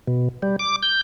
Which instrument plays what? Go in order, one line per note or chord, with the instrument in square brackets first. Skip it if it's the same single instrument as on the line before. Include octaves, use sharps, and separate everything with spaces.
[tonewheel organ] B2
G3
D6
G6